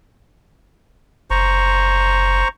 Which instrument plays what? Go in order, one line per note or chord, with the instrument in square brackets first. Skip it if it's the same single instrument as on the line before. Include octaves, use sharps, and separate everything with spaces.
[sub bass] F#1 [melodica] C5 A#5 C#6